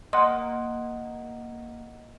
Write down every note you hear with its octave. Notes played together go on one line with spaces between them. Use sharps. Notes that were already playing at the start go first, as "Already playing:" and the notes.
A#3 D#5 F#5 C6